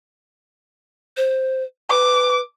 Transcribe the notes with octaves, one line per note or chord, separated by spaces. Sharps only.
C5
B4 D6